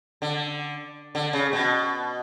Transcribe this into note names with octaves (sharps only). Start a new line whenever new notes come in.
D3
D3
C#3
B2